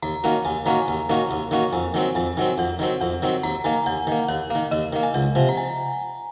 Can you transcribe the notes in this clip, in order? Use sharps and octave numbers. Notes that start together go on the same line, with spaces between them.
D#2 A#5
D#3 A#3 C#4 F#4
D#2 G#5
D#3 A#3 C#4 F#4 A#5
D#2
D#3 A#3 C#4 F#4
D#2
D#3 A#3 C#4 F#4
F2 G#5
D#3 F#3 C4
F2 G#5
D#3 F#3 C4
F2 F#5
D#3 F#3 C4
F2 F#5
D#3 F#3 C4
D#2 A#5
D#3 A#3 G#5
D#2 F#5
D#3 A#3
D#2 F5
D#3 A#3
D#2 D#5
D#3 A#3
G#5
C#2 F#5
C3 F3
A#5
G#5